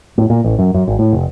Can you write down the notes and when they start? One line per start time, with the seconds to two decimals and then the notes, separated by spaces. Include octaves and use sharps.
0.18 A2
0.30 A#2
0.44 A1
0.59 F#2
0.74 F#2
0.87 G#1
0.99 A2
1.13 F1